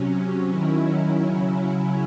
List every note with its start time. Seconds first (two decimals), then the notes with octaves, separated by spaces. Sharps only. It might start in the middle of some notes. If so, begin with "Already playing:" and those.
Already playing: C3 F#3 C#4
0.49 D#3 F#3 C#4 E4
1.22 C#3 F#3 C#4 E4